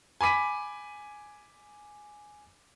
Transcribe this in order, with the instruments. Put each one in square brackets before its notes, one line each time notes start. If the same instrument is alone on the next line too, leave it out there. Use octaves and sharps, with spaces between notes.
[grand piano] G#5 B5 D6 B6 D#7